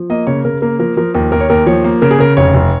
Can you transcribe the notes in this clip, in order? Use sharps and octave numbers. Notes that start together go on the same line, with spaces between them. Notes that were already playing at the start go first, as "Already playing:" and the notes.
Already playing: F3
A#3 D#5
C#3 C#5
C#3 A#4
A#3 A#4
F3 A#4
F3 A#4
D#2 A#4
D#2 A#4
C#5
D#2 A#4
F3 C#5
A#3
C#3 A#4
G#4
C#3 A#4
F1 C#5
F1